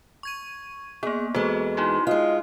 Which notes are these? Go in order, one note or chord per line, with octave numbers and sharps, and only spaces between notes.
C#6 G#6 D#7
A#3 B3 G#4
E2 G#3 F#4 A4 C5
D#4 E4 F#4 C6
G#3 F4 D#5